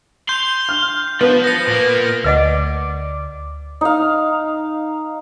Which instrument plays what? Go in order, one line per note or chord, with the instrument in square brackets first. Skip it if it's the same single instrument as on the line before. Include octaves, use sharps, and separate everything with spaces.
[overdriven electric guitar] C6 [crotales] G6 F7
[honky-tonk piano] F6
[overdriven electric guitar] F3 [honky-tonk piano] B3
[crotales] A#6 C#7
[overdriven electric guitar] A#2 A#3
[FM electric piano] D2 D5 D6 [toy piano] B4 D#5 F#5
[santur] D#4 F5